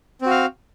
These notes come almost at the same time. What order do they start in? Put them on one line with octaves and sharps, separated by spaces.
C4 F#4 F5